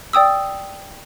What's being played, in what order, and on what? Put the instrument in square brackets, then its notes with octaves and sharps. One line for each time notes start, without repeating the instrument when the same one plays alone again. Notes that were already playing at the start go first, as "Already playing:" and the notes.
[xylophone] D5 G5 D#6 E6